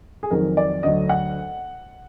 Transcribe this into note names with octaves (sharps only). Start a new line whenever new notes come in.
G#4
F2 D#3 F#3 A#4
D5
D2 D3 F#3 D#5
F#5